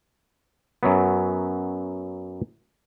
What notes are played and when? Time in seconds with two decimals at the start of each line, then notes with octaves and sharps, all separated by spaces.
0.83 F#2 F#3 B3